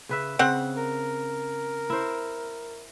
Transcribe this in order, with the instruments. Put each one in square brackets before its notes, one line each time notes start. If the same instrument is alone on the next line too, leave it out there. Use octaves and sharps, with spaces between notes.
[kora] C#3 B4 E5
[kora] C#3 [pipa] C4 F#5
[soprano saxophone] A#4
[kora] E4 C5